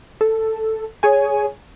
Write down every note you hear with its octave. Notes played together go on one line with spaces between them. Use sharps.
A4
G#4 C#5 G#5